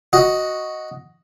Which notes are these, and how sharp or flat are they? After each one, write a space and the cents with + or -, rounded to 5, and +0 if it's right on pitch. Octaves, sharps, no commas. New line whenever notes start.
F#4 +0 D#5 +5